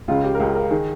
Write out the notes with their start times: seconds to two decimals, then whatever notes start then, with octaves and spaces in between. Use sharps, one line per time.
0.08 C#2 C#3 F4
0.23 G4
0.35 A#4
0.40 C#2 C#3 G#4
0.55 A#4
0.71 D#3 G#4